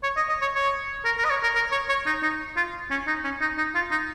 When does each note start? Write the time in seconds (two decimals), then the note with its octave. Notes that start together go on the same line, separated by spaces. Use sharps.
0.03 C#5
0.17 D#5
0.29 D#5
0.41 C#5
0.55 C#5
1.05 A#4
1.18 A#4
1.25 D#5
1.30 C#5
1.43 A#4
1.55 A#4
1.72 C#5
1.89 C#5
2.06 D#4
2.23 D#4
2.57 F4
2.91 C#4
3.07 D#4
3.24 C#4
3.41 D#4
3.58 D#4
3.75 F4
3.91 D#4